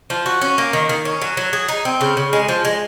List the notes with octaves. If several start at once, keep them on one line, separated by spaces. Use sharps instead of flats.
F3
F#4
C#4
A#3
D#3
D#3
C#4
F#3
F#3
G#4
D#4
C4
C#3
C#3
G#3
F3
G#3